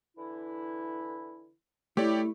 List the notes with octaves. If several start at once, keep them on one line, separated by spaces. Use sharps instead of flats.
D3 E3 E4
A3 E4 G4 C#5 D5